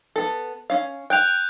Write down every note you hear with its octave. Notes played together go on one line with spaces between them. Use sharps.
B3 A4
C#4 F5
G5 F#6 G6 F7